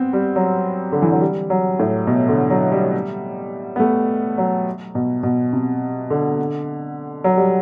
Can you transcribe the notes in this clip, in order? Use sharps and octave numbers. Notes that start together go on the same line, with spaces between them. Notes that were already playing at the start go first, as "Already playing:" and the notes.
Already playing: B3 C4
G3
F#3
D3
E3
F#3
G3
F#3
A2
B2
D3
F#3
G3
B3
A3
F#3
B2
B2
C3
D3
F#3
G3